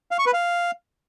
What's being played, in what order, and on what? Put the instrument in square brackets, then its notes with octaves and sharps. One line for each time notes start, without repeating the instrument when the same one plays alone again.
[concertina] F5
C#6
B4
F5